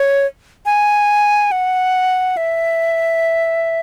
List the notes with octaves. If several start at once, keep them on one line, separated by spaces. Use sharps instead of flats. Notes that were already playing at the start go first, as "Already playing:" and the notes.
Already playing: C#5
G#5
F#5
E5